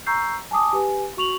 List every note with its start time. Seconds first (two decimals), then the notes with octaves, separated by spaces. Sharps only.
0.06 A#5 C#6 E6 G6 C7
0.51 G#5 A5 D6 D#6
0.73 G4 B4 G#5
1.17 F#4 C#6 F7 F#7